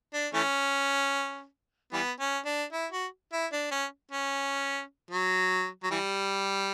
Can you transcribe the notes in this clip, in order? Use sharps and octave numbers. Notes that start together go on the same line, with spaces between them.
D4
E3 A3 C#4
E3 G3 B3
C#4
D4
E4
F#4
E4
D4
C#4
C#4
F#3
F#3
E3 G3